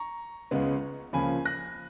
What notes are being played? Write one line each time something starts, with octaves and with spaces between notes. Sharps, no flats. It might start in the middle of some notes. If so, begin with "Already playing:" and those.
Already playing: A#5 C#6
C#2 C#3 G#3 B3
C#2 C#3 F3 A#3 G#5 B5
F#6 A#6